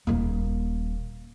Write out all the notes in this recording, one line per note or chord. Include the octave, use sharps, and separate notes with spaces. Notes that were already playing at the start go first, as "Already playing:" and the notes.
D#1 A#3